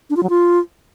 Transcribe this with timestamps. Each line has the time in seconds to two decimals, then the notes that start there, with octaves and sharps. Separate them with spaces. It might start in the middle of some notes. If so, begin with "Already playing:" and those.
0.10 D4
0.17 F4
0.23 F#3
0.30 F4